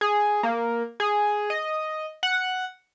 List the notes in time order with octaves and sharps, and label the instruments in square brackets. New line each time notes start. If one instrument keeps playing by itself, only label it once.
[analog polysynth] G#4
A#3
G#4
D#5
F#5